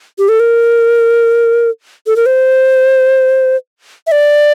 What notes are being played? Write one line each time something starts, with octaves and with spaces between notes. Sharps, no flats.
G4
A4
A#4
A4
A#4
C5
E5
D5